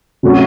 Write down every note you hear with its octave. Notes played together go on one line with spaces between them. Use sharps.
C3 F#3 A3 C#4 F#4